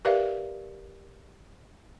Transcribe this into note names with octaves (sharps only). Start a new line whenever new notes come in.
G4 A#4 B4 D5 E5 F5